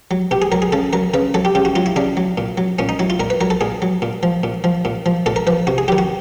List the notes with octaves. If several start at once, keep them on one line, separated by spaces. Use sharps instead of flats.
F#3
B2 G4
G#4
F#3 A#4
G#4
C#3 A4
F#3 A#4
C#3 B4
F#3 A4
G4
C#3 G4
F#4
F#3 F4
E4
C#3 D4
F#3
A#2
F#3
A#2 C#4
D#4
F#3 E4
F4
A#2 A#4
B4
F#3 A#4
A4
A#2 G#4
F#3
A#2
F3
A#2
F3
A#2
F3
A#2 A4
A#4
F3 B4
C3 F#4
G#4
D#3 F#3 G4
F#4